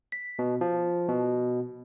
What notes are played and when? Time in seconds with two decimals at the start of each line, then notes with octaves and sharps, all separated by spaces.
0.12 B6
0.39 B2
0.61 F3
1.08 B2